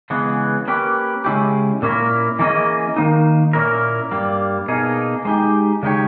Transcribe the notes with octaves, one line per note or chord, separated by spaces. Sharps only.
C#3 E3 G#3 B3
A#3 C#4 G4 B4
C#3 G#3 C#4 E4 G4
A#2 A#3 C#4 E4 A#4
E3 A#3 C#4 G#4 D#5
D#3 A#3 D#4
A#2 A#3 C#4 E4 A#4
G2 G3 A#3
B2 A#3 D#4 G#4
G#3 D#4 G4
C#3 G#3 D#4 G4 C#5